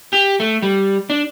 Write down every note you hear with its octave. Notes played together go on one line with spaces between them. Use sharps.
G4
A3
G3
D4